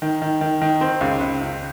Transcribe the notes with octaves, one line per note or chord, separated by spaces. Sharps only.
D#3
D#3
D#3
D#3
C4
C#2
C#2
C#2